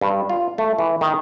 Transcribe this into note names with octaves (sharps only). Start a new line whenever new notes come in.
G2
F4
A3
E3
D#3